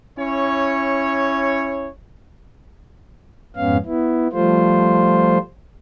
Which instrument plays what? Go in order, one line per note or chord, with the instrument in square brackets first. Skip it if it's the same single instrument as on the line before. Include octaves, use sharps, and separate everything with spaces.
[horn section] C#4 E4 C#5
[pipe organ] F2 G#2 B3 C#4 F5
B3 E4
F3 G3 A3 F4 C5